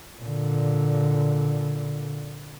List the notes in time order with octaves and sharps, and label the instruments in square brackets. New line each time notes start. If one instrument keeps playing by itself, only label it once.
[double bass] A#2 D3